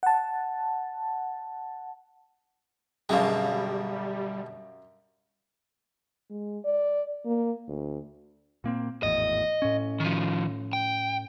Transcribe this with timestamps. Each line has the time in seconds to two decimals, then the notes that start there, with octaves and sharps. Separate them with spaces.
0.03 F#5 A5
3.09 F#2 B2 D3 G3 G#3 F5
6.30 G#3
6.65 D5
7.26 A#3
7.68 D2
8.64 A#2 A#3 C4
9.03 G#1 E2 A2 D#5
9.62 A2 C#4
10.00 D#3 F3
10.73 G5